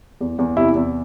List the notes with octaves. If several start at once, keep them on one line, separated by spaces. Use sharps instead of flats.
E2
E2
C3 E4
E2